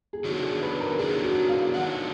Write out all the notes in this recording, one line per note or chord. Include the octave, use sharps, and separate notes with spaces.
G#4
D#3 F#3 D4 F#4
G#4
B4
A#4
D#3 F#3 D4 G#4
F#4
F5
D#3 F#3 D4 F#5